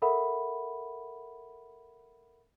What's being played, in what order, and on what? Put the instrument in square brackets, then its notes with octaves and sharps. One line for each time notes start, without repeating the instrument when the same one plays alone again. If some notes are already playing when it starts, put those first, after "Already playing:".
[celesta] A4 A#4 E5 F#5 B5